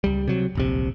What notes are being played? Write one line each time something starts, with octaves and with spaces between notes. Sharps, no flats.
C#2 G3
C3 F#3
D1 A#1 C3